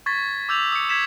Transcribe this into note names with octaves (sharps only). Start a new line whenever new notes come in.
C#6 G#6 A6 B6
D6 E6 G6 F7
D#6 C#7
G#6 B6 E7